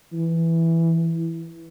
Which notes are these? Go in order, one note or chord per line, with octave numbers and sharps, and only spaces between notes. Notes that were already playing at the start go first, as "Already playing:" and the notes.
E3